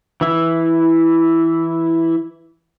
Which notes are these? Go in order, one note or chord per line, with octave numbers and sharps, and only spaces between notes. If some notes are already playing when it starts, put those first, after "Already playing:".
E3 E4